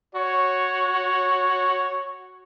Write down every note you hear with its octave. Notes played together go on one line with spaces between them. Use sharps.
F#4 C#5